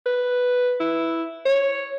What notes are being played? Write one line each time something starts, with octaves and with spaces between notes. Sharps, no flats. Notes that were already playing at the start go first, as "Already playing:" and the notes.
B4
E4
C#5